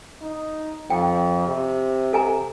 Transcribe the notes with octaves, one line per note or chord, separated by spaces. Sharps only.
D#4
F2 G5
C3
A4 G#5 A#5